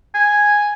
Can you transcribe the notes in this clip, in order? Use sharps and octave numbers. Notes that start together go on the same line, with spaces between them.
G#5